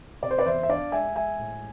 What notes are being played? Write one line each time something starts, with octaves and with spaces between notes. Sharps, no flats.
C3 D5
C5
B4 D5
E2 C5 E5
E5
D4 D5 F5
G#3 E5 G#5
G#3 E5 G#5
A2